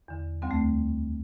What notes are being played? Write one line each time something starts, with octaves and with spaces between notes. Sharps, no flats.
E2 D3
D2 D3 G3 C4
A3